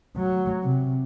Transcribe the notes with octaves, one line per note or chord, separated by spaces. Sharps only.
F#3
C3